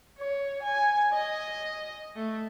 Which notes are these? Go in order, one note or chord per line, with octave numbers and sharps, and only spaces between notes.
C#5
G#5
D#5
A3